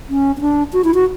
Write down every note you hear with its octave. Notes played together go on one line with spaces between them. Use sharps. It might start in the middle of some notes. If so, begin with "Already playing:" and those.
C#4
C#4
D4
F#4
E4
F#4